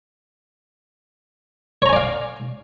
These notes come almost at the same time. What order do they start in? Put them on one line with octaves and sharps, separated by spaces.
C#5 A#5 G#5 D5 F5